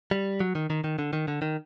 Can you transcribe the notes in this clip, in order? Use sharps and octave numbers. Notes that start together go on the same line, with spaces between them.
G3
F#3
D#3
D#3
D#3
D3
D#3
D3
D#3